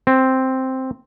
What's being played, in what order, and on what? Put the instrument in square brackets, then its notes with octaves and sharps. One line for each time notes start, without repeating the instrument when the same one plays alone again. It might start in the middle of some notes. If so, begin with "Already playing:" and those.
[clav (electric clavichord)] C4